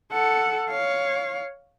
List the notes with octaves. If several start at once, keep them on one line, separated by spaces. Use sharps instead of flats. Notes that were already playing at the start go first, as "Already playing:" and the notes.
A4 F#5
C#5 F5